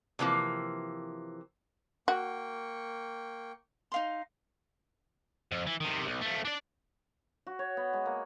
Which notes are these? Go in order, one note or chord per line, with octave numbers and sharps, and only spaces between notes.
C3 E3 F3 A#3
A#3 F#4 G5 C#6
D#4 F5 C6
F2
E3
C3 D#3
B1
F3 A3
D4 D5
F#4
C#5
B3
G#3
A#3